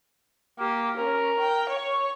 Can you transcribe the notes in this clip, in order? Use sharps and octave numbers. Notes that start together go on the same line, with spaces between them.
A#3 G4
C#4 A#4
G5
C#5 C#6